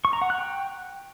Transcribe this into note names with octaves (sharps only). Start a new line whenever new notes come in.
C#6
A#5
F#5
F#6
G5